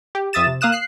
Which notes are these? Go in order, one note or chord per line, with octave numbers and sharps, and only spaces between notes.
G4
F2 E5 D#6 A6 E7
C3
A#3 F5 D#6 F#6 E7
F#6 C7